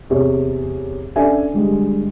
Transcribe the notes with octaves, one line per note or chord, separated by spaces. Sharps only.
E2 C3 G#4 C#5
C#4 D4 A4 D5 E5 G#5
D3 G3 G#3